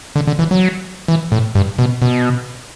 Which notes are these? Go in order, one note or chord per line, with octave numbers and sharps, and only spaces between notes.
D3
D3
E3
F#3
E3
A2
G2
B2
B2